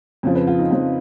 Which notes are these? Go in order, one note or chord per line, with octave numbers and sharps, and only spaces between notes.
F2 C#3 F3
B4
F4
D#4
F2 C#3 F3 F4